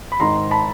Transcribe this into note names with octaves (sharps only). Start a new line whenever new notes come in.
B5
G#1 G#2 D#3 A#5 C6
A5 B5